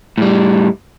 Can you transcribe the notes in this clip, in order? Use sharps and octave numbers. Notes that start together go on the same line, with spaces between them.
A2 G3